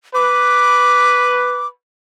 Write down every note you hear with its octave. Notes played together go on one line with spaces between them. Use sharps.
B4 D6